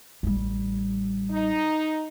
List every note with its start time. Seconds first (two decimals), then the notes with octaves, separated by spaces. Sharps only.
0.23 A1 G3
1.31 D#4